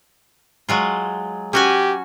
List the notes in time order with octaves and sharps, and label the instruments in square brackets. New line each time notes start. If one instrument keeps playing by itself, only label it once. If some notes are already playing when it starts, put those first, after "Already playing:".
[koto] F#3 G#3 F4
[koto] C#4 F#4 G#5 [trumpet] G4